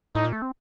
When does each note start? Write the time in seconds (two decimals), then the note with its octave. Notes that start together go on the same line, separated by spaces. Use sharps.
0.15 A2 D#4
0.24 A#2
0.33 A3
0.42 C4